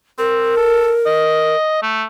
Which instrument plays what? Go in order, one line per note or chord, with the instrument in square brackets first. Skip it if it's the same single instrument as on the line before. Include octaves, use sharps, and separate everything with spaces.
[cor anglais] C4 [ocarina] A#4
[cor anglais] A4
D#5
A3